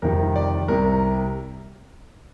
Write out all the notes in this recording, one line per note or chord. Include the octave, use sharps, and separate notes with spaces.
F2 C3 D#3 G3 A#4
D5
C2 C3 G3 A#4